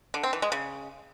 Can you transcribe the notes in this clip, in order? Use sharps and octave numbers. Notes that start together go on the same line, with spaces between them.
D3
C4
E3
G#3
C#3